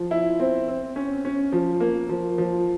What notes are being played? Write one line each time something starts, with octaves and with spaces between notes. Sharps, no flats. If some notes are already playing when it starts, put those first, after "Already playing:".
Already playing: F3
E4
C4
C4
C#4
C#4
F3
A#3
F3
F3